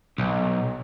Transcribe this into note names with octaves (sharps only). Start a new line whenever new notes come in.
B1